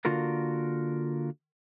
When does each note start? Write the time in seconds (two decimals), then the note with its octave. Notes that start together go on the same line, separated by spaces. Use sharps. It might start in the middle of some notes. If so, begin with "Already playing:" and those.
0.05 D3 A#3 F4 F#4 A#4